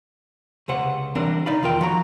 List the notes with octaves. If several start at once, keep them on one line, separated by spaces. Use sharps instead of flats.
C#2 C3 C5 F#5
E3 G3 C4 D4 A#4
C3 D#4 D5 F5 B5
E2 D#3 F4 A#4 G5
F3 F#4 A#5